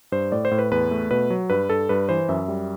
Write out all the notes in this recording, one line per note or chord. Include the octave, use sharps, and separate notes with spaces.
G2 C5
A2 D5
C5
A2
B4
E2 B4
A3
B2 B4
F#3
G2 B4
G2 A4
G2 B4
E3 C5
F#2 E5
G3